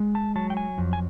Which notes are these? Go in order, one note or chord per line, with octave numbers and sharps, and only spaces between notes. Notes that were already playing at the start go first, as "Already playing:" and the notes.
Already playing: G#3
A5
F#3 A5
G5
G#5
F2
G#5